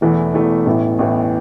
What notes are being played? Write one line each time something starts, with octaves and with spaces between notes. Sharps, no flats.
E1 E2 E3 A3 E4
E1 E2 E3 A3 E4
A1 A2 E3 B3
A1 A2 E3 B3